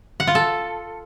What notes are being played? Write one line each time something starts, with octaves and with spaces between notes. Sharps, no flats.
F#5
F4
A4